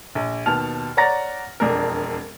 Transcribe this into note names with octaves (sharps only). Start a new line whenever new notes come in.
A#1
D#2 B2 A5 F6 F7
C#5 D5 F#5 A#5 A6 A#6
E1 F2 D4 A#4